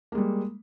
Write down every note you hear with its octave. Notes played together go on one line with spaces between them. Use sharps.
G3 G#3 A#3